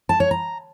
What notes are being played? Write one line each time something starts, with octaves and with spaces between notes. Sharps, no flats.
A5
C#5
A#5